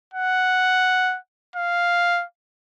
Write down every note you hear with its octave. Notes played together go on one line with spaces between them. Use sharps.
F#5
F5